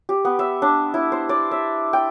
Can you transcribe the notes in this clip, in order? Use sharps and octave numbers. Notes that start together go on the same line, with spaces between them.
G4
B3
E5
D4
E4
C5
D5
E5
G5